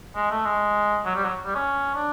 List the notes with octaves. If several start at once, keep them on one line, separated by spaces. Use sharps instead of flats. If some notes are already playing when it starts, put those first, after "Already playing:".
G#3
A3
G#3
F#3
G3
F#3
G3
C#4
D4